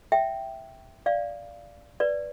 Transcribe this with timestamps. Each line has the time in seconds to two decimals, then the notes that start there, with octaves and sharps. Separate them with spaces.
0.12 E5 G5
1.06 D5 F5
2.00 B4 D5